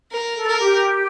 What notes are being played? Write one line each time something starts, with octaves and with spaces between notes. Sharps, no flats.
A#4
A4
A#4
G4